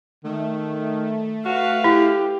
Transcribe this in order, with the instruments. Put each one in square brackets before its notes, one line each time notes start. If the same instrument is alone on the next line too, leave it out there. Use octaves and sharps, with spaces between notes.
[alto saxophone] D#3 [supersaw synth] A3
[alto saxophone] F#4 [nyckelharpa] B4 F5
[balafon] E4 [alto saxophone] G4